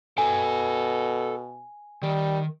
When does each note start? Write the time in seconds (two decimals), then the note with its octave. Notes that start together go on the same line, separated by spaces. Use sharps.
0.18 B2 A4 G5 G#5
2.03 D#3 G3